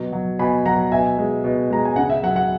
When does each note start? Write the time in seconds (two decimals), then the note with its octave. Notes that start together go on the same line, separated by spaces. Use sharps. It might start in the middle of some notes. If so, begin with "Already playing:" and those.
Already playing: B2 F#3
0.13 F#3
0.39 B2 G#5 B5
0.66 F#3 F#5 A#5
0.91 B2 E5 G#5
1.18 G#3
1.44 B2
1.70 G#3 A#5
1.85 G#5
1.96 C#3 F#5
2.10 E5
2.23 F#3 F#5
2.36 F#5